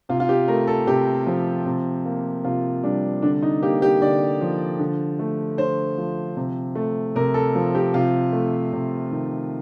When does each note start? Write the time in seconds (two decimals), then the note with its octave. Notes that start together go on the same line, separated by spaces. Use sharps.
0.09 C3 F4
0.20 F4
0.29 G4
0.48 A3 A#4
0.67 A4
0.87 C3 G4
1.27 F3
1.66 C3
2.05 A#3
2.44 C3 F4
2.83 G3 D4
3.22 D3 D4
3.42 D#4
3.62 A#3 G4
3.82 G4
4.01 D3 D5
4.41 F3
4.79 D3
5.19 A3
5.58 D3 C5
5.98 F3
6.36 C3
6.75 A3
7.15 C3 A#4
7.34 A4
7.55 F3
7.75 G4
7.94 C3 F4
8.33 A3
8.73 C3
9.11 D#3